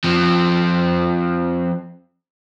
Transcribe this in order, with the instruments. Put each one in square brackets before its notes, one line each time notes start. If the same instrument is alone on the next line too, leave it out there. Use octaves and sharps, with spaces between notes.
[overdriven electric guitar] F3 C4